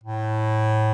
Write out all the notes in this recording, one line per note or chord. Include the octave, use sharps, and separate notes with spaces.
A2